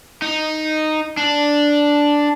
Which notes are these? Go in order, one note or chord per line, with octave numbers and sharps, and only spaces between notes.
D#4
D4